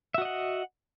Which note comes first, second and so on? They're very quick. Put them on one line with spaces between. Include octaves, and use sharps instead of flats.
E5 F#4 D#5 F#5